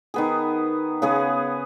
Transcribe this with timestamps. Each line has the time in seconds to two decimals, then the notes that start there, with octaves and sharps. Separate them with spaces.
0.14 D#3 B3 G#4
1.02 C#3 B3 G#4